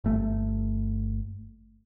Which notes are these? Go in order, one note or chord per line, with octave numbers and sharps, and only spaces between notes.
G1 A3